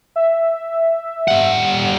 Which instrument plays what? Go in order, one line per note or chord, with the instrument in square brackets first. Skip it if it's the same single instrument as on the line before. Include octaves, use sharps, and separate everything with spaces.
[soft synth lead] E5
[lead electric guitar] G3 F#5